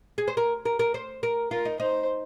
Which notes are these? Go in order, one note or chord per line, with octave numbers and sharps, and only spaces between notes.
G#4
C5
A#4
A#4
A#4
C5
A#4
F4 A#4
D#4
D#4 C5